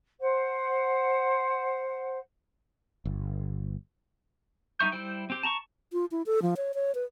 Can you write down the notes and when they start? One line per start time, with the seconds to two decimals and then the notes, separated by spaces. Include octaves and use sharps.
0.21 C5 F#5
3.05 G1
4.79 G3 D#4 E5 C#6 G6
4.92 G3 E4 C5 G5
5.30 C4 G4
5.43 A5 A#5 C6 C#6
5.93 F4
6.11 E4
6.26 A4
6.42 F3
6.57 C#5
6.74 C#5
6.95 B4